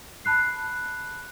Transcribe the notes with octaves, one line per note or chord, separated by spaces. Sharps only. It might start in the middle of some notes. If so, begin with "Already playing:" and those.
A5 B5 F#6 C7